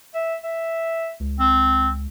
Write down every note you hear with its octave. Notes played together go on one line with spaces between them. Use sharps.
E5
E5
C#2
C4